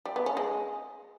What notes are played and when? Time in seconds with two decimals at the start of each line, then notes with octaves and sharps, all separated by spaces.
0.05 G3
0.16 B3
0.26 C#4
0.37 G#3